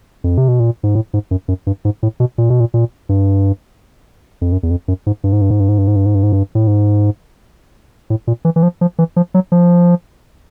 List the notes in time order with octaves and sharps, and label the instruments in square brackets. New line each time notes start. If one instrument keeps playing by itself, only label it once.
[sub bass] F2
C3
B2
A#2
G#2
A2
G#2
F#2
F#2
G2
G#2
A2
B2
A#2
B2
A#2
A#2
G2
F2
F#2
E2
F2
F#2
G#2
G2
G#2
G2
G#2
G2
G#2
G2
G#2
G2
G#2
G2
G#2
G2
A2
G#2
A2
A#2
E3
E3
F3
F3
E3
F3
F#3
F3